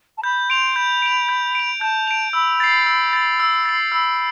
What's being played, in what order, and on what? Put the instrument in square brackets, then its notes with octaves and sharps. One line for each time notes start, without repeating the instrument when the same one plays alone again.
[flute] A5
[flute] B5 [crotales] G6
[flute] C6 [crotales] D7 F7
[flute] B5 [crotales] G6
[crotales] D7 F7
G6
D7 F7
[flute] A5 [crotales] G6
[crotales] D7 F7
[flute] B5 [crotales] E6
[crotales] A6 C7
E6
A6 C7
E6
A6 C7
[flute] B5 [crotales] E6